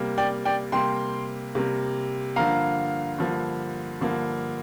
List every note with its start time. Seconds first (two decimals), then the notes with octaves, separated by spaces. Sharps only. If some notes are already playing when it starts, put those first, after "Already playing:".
Already playing: C3 G3 A#3
0.18 D5 G5
0.45 D5 G5
0.72 C3 G3 A#3 G5 C6
1.55 C3 G3 A#3
2.36 G2 D3 F3 A#3 F5 A#5
3.18 G2 D3 F3 A#3
4.01 G2 D3 F3 A#3